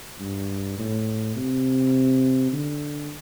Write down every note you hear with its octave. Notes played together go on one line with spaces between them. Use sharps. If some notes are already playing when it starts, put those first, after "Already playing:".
G2
A2
C3
D3